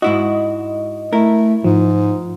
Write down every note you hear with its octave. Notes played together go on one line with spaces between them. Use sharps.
G#2 E4 F#4 D#5
A3 E4 A#4
G#2 F3